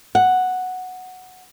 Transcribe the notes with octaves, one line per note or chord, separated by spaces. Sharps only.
F#5